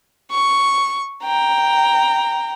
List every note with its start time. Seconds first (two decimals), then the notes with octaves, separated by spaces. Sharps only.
0.31 C#6
1.24 G5 A#5